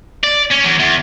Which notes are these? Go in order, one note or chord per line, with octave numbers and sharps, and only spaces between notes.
D5
C#4
E2
E2